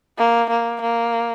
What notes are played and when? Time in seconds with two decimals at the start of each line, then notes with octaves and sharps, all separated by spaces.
0.18 A#3
0.50 A#3
0.81 A#3